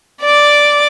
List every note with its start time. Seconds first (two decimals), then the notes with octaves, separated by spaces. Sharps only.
0.22 D5 D6